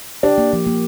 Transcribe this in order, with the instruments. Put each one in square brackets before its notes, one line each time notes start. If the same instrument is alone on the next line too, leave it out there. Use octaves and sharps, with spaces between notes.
[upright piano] D4 [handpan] G4
[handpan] A#3
F3
A#3